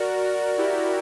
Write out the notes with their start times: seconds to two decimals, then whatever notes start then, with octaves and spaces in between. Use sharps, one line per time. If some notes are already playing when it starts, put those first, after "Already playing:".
Already playing: F#4 A#4 D5
0.22 F#4 A#4
0.58 E4 G4